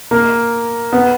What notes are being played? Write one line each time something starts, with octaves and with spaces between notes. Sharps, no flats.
A#3
B3